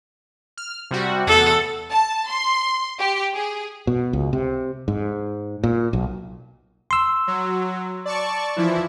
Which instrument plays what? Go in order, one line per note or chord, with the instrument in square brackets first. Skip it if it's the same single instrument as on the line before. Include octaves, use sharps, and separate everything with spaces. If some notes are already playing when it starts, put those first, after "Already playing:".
[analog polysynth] F6
C3 G3 F#4
[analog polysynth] E2 F#5 [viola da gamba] A4
[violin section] A5
C6
G4
G#4
[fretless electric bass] B2
C#2
C3
G#2
A#2
B1
[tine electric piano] C6 E6
[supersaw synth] F#3
D5 A5 C#6
E3 F3 E4